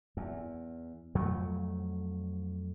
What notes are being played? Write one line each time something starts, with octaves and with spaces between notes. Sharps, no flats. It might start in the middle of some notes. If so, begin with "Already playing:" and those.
E2
F2 F#3 A3